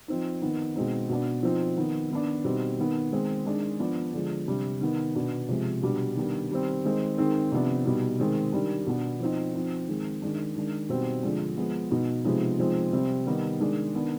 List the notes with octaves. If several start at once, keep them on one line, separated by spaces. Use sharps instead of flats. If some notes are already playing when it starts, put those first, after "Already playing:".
F3 C4 D#4
D#3 B3 D#4
B2 G#3 C4 D#4
B2 B3 D4
F3 C4 D#4
D#3 B3 D#4
D#3 B3 D4
B2 G3 C4 D#4
D#3 B3 D#4
D#3 G#3 C4
D#3 G#3 D4
F3 B3 D4
D3 F3 G#3
C3 G3 D4
D#3 B3 D#4
B2 B3 D4
C3 F3 G#3
B2 G3 D4
D#3 G3 B3 D4
D#3 G3 C4
D#3 G#3 C4 D#4
D#3 G#3 C4 D#4
C3 F3 B3 D4
B2 G3 B3 D#4
D#3 G#3 C4
D#3 G3 D4
B2 B3 D4
F3 C4 D#4
F3 C4 D#4
D#3 G#3 C4
D#3 G#3 D4
D#3 G#3 D4
B2 G3 C4 D#4
D3 F3 G#3 D4
F3 G#3 B3
B2 B3 D#4
C3 F3 G#3 B3 D#4
F3 G#3 C4 D#4
C3 G3 C4
D#3 G3 B3 D#4
D#3 G#3 D4
D#3 B3 D4